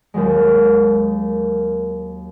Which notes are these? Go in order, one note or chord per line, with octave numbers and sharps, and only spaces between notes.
D#2 D#3 F#3 G#3